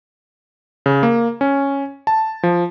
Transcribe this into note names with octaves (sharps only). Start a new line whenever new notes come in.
C#3
A#3
C#4
A5
F3